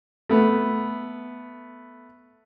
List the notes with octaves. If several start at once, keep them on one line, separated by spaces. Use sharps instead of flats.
A3 B3